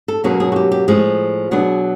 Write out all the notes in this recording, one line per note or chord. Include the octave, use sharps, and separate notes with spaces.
A4
B2 F#3 A#3 C#4 G#4
G#4
F#4
G4
G4
A2 F3 G#3 G#4
B2 F#3 B3 D4 G#4